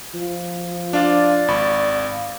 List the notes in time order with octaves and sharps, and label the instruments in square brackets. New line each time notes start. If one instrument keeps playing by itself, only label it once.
[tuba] F3
[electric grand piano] D4 F4 D6 [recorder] D5 [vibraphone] F5
[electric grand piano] G#1 B5 C#6